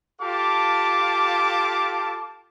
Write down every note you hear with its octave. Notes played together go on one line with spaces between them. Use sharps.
F4 G4 A4 F5 A5 D6